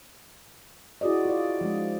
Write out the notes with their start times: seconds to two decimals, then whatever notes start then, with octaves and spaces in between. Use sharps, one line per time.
1.01 E4 F#4 G#4 D5 D#5
1.25 F4 D5
1.61 F3 G#3 D4